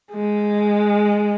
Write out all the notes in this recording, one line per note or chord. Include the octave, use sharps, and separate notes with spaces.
G#3